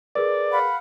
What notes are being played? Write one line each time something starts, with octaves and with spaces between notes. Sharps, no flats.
G#4 A#4 B4 D5
F5 F#5 B5